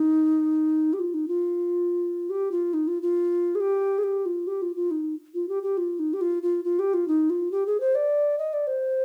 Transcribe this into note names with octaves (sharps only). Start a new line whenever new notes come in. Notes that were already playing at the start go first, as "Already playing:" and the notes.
Already playing: D#4
G4
F4
D#4
F4
G4
F4
D#4
F4
F4
G#4
G4
G#4
G4
F4
G4
F4
F4
D#4
F4
G4
G4
F4
D#4
G4
F4
F4
F4
G4
F4
D#4
F4
G4
G#4
C5
D5
D#5
D5
C5